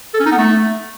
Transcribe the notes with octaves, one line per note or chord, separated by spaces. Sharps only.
A4
C#4
D#4
B3
A3